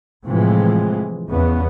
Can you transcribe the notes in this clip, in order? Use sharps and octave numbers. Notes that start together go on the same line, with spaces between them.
A2 C3 E3 F3 G#3
E2 C#3 B3